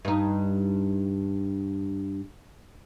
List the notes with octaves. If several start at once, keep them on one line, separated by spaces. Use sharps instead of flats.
G2 D#4